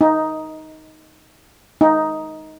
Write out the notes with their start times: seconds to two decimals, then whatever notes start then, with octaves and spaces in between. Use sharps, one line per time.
0.01 D#4
1.81 D#4